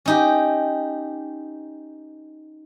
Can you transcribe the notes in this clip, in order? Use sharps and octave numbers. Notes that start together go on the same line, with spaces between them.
C#4 D#4 G4